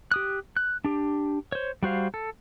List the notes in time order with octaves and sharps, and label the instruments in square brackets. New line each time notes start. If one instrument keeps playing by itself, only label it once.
[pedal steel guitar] G4 D#6 F#6
F#6
D4 G4
C5 C#5
G3 F#4 C5 F5
A4